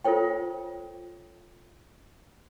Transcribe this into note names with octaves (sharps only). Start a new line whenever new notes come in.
F4 A4 C5 C#5 G5